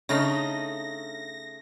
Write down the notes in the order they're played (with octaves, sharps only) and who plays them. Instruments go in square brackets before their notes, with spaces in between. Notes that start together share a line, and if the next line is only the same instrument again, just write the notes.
[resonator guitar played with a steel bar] C#3 A3 D#4 [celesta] D4 C#5 [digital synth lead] A#6